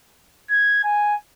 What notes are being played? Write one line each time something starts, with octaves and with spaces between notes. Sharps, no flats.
G#6
G#5